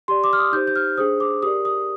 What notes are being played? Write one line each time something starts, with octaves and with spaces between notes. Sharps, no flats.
G4 D5 C6
D6
F6
D#6
D#4 G4 C5 G6
G6
F6
D4 G#4 C5 D#6
D6
G4 A#4 D5 D#6
D#6